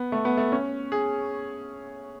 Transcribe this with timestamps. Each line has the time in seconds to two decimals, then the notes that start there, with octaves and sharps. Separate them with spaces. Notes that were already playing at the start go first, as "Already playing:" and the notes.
Already playing: B3
0.12 A3
0.25 B3
0.38 A3
0.52 C#4
0.92 G#4